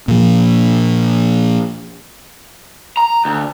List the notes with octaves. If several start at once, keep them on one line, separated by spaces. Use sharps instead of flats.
A#2 F3
A#5
D2